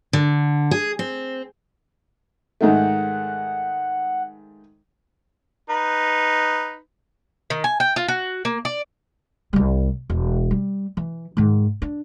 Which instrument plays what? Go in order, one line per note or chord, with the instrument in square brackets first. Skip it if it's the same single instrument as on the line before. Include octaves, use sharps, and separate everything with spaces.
[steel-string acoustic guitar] D3
G#4
C4
[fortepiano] G#2 D#3 A3 [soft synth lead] F#5
[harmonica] D#4 B4
[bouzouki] D#3
G#5
G5
F4
F#4
A#3
D5
[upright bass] C2 G3
E1
G3
E3
G#2 D#3
D4